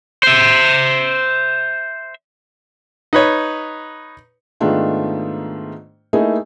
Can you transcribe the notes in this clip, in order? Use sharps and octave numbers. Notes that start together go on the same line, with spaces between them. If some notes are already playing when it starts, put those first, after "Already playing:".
C5 E5
D#4 B4 C#5
G#2 D#3 A3 B3 D4 F4
A3 A#3 D#4 E4 G#4